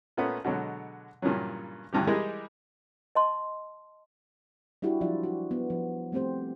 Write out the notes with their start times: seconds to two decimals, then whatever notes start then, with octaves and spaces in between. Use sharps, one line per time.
0.17 A#2 A3 B3 C#4
0.44 B2 D3 F#3 G#3
1.22 G2 A#2 C#3 E3 F#3
1.93 G#1 D2 G2 E3 G4
2.07 E3 G3 G#3 G4 G#4 A#4
3.15 D#5 A5 C6
4.82 G3 D4 E4 F#4 G4
5.01 F3 F#3 D4 F4 D5 E5
5.23 F#4
5.51 B3
5.70 F3
6.12 G3 A3 C4 G4 C5